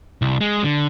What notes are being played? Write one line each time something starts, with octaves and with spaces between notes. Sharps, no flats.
C2
G#3
D3